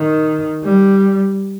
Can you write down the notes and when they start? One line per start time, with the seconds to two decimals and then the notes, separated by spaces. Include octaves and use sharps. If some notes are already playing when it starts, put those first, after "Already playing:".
Already playing: D#3
0.64 G3